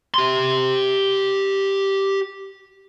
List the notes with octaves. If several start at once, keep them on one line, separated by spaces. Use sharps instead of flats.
G4 C6